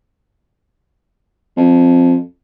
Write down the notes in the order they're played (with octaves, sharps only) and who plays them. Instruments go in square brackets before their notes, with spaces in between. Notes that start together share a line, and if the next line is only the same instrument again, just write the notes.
[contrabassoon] F2